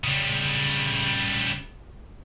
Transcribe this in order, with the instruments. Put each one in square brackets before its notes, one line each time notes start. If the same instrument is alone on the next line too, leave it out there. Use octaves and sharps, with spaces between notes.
[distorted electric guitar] C#3 G3